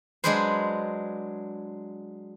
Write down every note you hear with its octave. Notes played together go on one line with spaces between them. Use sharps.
F#3 G#3 D4 G#4 B4 C5